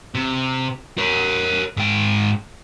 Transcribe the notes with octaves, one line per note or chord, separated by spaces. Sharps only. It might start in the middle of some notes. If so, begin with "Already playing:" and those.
C3
A#4 C#5
G#2 G5